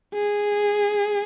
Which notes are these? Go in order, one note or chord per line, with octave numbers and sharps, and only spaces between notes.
G#4